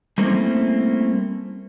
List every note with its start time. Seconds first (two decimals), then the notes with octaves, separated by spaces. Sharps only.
0.18 G3 A3 A#3 C4 C#4 E4